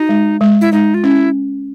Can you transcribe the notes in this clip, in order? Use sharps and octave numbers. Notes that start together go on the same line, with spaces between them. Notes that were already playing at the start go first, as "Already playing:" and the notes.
Already playing: D#4 F#4
G#3
G#3
E4
G#3 D#4
F4
C#4 E4